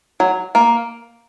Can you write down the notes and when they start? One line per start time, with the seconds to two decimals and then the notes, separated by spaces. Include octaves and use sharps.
0.20 F#3
0.55 A#3